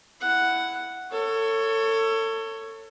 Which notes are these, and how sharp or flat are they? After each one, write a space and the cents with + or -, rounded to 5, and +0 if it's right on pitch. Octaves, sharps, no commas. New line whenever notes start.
E4 +5 F#5 +0
A4 +30 C#5 +0